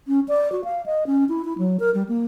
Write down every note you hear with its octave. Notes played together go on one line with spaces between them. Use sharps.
C#4
D5
F#4
F5
D#5
C#4
E4
E4
F#3
A#4
G3
A#3